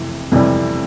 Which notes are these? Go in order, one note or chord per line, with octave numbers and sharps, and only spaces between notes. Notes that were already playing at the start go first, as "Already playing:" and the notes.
Already playing: F2 C3 E3
F2 C3 E3 G3